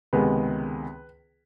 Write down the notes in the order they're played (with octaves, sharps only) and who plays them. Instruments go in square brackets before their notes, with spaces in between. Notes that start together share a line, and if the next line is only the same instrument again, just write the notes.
[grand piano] C#2 C3 D#3 G#3 B3 B4